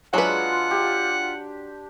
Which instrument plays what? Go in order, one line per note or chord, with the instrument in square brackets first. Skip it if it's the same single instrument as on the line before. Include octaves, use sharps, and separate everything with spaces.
[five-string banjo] F#3 B4 [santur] G#3 D4 G#4 [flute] F4 [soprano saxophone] F#5
[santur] G4